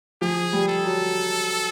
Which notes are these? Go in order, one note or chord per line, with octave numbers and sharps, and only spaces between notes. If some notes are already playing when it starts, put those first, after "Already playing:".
F3 G#4
G3
A4
F#3